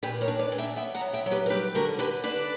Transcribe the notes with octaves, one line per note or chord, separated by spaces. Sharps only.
A#2 G4 B4
A#4 C#5
D4
B4 D5
A#2
E5 G5
B3 E5 G5
F#5 A#5
F#3
E5 G5
F#3
G4 B4
A#4
G3 G4 B4
D3 F#4 A#4
D3 G4 B4
D4 B4 D5